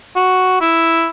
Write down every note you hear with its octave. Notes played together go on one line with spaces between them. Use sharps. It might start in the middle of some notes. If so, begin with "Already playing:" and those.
F#4
E4